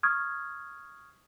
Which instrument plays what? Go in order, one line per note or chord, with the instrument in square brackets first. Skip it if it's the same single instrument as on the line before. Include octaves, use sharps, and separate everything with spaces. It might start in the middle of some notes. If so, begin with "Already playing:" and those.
[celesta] C#6 D#6 F6 G#6